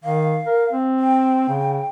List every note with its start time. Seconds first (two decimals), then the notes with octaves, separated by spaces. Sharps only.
0.04 D#3 F5
0.46 A#4
0.72 C4
0.99 G5
1.49 C#3